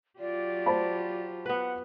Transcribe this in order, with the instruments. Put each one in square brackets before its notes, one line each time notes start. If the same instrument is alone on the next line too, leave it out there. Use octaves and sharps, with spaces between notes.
[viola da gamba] F#3 F4 G4 [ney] D5
[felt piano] C5 A5 B5
[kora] B3 B4 [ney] F#5